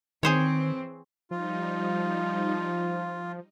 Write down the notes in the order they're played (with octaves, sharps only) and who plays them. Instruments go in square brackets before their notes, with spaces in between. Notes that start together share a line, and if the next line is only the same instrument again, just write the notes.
[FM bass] D#3 [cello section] E3 C4 [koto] G#4 C5 C#5
[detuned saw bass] F3 [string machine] G3 D#4 [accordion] F4